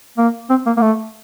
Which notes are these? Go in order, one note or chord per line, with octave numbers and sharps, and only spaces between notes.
A#3
C4
A#3
A#3
A3